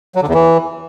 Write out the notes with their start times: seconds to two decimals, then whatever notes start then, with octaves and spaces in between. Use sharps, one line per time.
0.15 F#3
0.22 D3
0.28 E2
0.34 E3